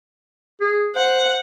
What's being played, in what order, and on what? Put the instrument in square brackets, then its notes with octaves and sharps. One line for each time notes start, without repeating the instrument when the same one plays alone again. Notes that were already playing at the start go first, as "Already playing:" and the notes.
[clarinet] G#4
[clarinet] C5 [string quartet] F#5